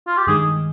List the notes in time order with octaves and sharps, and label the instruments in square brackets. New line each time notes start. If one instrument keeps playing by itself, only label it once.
[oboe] F4
G4
[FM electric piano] G2 D#3 G#3 [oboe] G#4